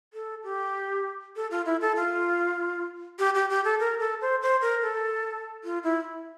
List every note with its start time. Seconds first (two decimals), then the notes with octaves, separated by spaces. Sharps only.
0.13 A4
0.44 G4
1.36 A4
1.51 F4
1.66 E4
1.81 A4
1.96 F4
3.19 G4
3.35 G4
3.50 G4
3.64 A4
3.80 A#4
4.00 A4
4.21 C5
4.42 C5
4.61 A#4
4.82 A4
5.64 F4
5.83 E4